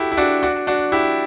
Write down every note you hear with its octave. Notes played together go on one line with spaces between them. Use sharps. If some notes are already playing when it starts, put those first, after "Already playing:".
Already playing: E4 F#4 G4 A4
E4
D4 F#4
D4 F#4
D4 F#4
E4 G4